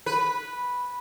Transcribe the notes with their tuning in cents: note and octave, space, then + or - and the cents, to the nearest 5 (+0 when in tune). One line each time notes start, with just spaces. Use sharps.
B4 -5